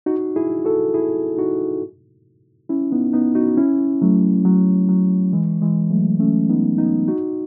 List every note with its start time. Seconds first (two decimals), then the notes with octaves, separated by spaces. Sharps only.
0.06 D#4 F#4
0.36 E4 G#4
0.65 F#4 A4
0.94 E4 G#4
1.38 D#4 F#4
2.69 C#4 E4
2.91 B3 D#4
3.13 B3 D#4
3.35 D#4 F#4
3.57 C#4 E4
4.02 F#3 A3
4.45 F#3
4.89 F#3
5.33 E3 G#3
5.61 E3 G#3
5.91 F#3 A3
6.20 A3 C#4
6.49 B3 D#4
6.78 B3 D#4
7.08 D#4 F#4